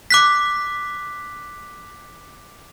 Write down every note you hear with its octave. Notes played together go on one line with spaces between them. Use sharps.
D6 F#6 B6